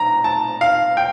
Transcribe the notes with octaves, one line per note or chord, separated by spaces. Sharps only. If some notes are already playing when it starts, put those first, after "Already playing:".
Already playing: A#5
A5
F5
G5